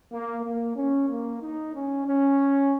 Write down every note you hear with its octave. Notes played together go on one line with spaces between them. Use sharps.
A#3
A#3
C#4
A#3
D#4
C#4
C#4